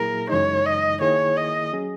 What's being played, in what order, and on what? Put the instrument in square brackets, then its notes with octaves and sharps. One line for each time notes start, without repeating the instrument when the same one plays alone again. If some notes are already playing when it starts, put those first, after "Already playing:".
Already playing: [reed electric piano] A#2 F#3 A#3 E4 G#4 [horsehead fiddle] A#4
[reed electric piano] F#2 C#3 E3 G#3 D#4 [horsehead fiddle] C#5
[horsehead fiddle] D#5
[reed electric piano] D#3 A#3 E4 G#4 [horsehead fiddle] C#5
[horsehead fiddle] D#5
[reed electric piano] F#3 C#4 G#4